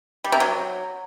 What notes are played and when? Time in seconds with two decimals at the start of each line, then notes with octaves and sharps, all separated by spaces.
0.24 G3
0.32 C3
0.40 F#3